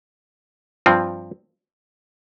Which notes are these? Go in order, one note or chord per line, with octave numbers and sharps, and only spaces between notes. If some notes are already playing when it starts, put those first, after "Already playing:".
G2 F3 C4